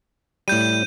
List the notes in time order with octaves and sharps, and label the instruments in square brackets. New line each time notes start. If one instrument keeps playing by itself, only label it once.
[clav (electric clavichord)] A2 G3 [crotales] G6 D#7